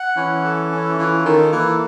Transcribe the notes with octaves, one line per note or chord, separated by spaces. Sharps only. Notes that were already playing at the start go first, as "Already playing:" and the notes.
Already playing: F#5
E3 C#4
A4
C#4
E3 F4
D#3 A4
E3 A#3